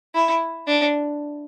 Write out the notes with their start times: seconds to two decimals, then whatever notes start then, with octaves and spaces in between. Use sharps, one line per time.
0.15 E4
0.67 D4